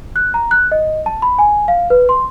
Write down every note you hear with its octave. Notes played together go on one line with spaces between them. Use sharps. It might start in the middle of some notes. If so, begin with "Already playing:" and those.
F#6
A#5
F#6
D#5
A5
B5
G#5
F5
B4
C6